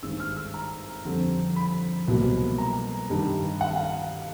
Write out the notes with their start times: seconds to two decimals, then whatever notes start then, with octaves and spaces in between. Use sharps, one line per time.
0.03 G#1 G2 D#3 G#3 E6
0.20 F6
0.37 E6
0.54 A#5
1.05 F2 D3 G3 C4
1.56 B5
2.08 C2 B2 F#3 A#3
2.58 A#5
3.10 G2 D#3 G3
3.61 F#5
3.74 F5